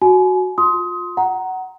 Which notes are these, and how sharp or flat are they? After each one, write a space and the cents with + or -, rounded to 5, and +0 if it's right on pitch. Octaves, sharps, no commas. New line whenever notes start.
F#4 +0 G#5 +30
F4 +25 C6 +0 D#6 +25
F#5 +15 A#5 +0